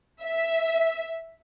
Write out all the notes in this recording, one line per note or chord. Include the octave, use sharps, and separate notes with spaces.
E5